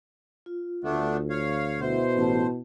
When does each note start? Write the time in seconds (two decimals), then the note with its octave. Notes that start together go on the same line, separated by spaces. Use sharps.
0.46 F4
0.84 D2 A3 B3 D4
1.30 C#5 F5
1.81 B2 E4 C5 E5 F#5
2.16 A1 B3 E4 A5